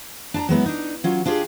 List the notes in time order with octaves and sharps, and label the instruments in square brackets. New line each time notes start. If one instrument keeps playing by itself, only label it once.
[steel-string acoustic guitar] D4 A5 A#5
F#3 G#3 B3 E4
D4 D#4
F#3 C#4 F4
D4 F4 G4 G#4